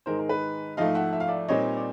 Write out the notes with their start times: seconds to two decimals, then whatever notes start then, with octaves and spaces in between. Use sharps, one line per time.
0.06 G#2 D#3 G#3 A#4 C5
0.19 A#4
0.29 B4
0.77 G#2 F3 A3 D#5 F5
0.95 E5 F#5
1.13 E5
1.20 F5
1.28 D5 E5
1.48 A#2 G3 C4 D#4 C#5 D#5
1.77 D5